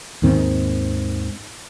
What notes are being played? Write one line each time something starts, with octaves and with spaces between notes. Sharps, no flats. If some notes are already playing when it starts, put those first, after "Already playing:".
D#2 G#2 D#3 C4